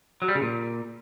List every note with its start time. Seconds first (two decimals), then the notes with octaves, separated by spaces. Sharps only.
0.22 F#3
0.28 G3
0.35 C#3
0.42 A#2